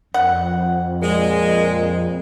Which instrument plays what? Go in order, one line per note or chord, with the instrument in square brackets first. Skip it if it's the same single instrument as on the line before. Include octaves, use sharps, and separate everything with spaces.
[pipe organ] F2 [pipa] F#5
[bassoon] A#2 [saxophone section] G#3